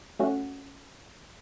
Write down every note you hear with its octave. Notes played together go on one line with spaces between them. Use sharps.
A3 C#4 F#4